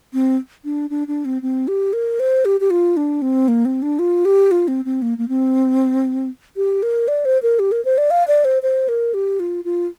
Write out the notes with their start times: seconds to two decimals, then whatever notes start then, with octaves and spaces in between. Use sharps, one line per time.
0.13 C4
0.65 D4
0.90 D4
1.08 D4
1.25 C4
1.42 C4
1.68 G4
1.93 A#4
2.20 C5
2.45 G4
2.60 G4
2.70 F4
2.97 D4
3.22 C4
3.48 A#3
3.65 C4
3.82 D4
3.99 F4
4.25 G4
4.51 F4
4.68 C4
4.85 C4
5.02 A#3
5.18 A#3
5.28 C4
6.56 G4
6.83 A#4
7.08 D5
7.25 C5
7.42 A#4
7.59 G4
7.72 A#4
7.85 C5
7.98 D5
8.11 F5
8.28 D5
8.45 C5
8.63 C5
8.88 A#4
9.14 G4
9.40 F4
9.65 F4